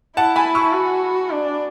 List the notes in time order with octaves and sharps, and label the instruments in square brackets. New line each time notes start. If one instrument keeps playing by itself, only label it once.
[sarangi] E4 [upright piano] F#5 A5
[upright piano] G#5 B5
C#6 E6
[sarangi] F#4
D4